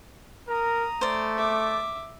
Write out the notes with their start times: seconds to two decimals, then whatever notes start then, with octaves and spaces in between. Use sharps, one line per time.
0.48 A#4 A#5 D#6
1.01 A3 C5 D5
1.37 E5 D6